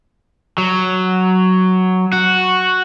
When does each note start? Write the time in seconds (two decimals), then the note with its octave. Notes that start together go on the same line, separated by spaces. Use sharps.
0.58 F#3
2.13 F#4